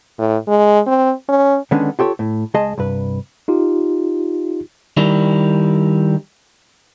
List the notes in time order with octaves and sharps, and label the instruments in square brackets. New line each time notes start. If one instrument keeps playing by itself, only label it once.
[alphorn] A2
G#3
C4
C#4
[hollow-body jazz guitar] D3 D#3 G#3 B3 C#4 D4
F4 G4 A4 C#5
A2
C#2 G#3 G#4 D#5 G#5 A5
C2 G2 B4
[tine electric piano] D#4 F4 G4
[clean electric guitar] D#3 G3 E4